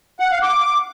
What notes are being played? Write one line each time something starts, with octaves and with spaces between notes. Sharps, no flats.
F#5
F5
D6